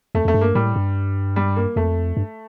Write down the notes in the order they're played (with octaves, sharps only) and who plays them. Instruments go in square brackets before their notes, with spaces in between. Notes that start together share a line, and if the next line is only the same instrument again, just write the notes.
[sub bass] F2 [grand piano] A3
[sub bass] F2 [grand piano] A3
[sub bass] G2
[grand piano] A#3
[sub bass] A2 [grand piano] G3
[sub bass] G2
[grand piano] G3
A#3
[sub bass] F2 [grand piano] A3
[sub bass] G2